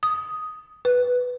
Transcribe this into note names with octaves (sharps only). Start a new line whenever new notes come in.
D#6
B4